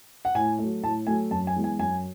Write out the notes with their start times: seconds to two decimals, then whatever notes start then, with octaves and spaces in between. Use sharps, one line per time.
0.25 F#5
0.35 A2 G#5
0.58 A3
0.64 F#3
0.83 A2 A5
1.07 F#3 A3 G#5
1.31 F#2 A5
1.47 G#5
1.56 E3 G#3 B3
1.64 G#5
1.79 F#2 G#5